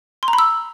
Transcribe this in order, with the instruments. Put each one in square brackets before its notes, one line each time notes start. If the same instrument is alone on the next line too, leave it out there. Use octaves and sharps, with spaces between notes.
[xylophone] C6
A#5
B5
E6